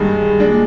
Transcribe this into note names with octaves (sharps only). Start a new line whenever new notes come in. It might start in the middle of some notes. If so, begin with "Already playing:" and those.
Already playing: G2 D#3 G#3
A#2 G#3 D4